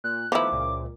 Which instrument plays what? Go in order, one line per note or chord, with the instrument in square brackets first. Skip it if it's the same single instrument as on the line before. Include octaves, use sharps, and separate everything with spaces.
[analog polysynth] A#2 [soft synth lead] F#6
[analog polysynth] D#3 A3 B3 [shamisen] F3 E4 [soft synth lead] D6
[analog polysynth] C#2 A#2